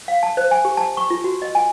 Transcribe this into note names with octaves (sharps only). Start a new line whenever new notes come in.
F5
A5
C5
G#5
G4
A5
C#6
F4
F#4
D#5
G#5